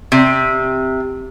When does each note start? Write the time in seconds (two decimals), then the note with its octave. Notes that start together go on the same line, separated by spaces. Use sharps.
0.12 C3